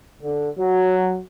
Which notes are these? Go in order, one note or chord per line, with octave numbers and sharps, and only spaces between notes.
D3
F#3